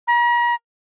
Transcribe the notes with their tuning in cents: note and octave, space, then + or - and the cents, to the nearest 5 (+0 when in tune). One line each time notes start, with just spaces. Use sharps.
A#5 +40